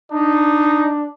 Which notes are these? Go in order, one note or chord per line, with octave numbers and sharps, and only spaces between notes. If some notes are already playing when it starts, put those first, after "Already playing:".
D4 D#4